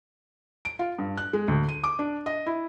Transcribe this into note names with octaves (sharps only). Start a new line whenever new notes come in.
D7
F4
G2
F#6
G#3
D2
D#7
D6
D4
D#5
E4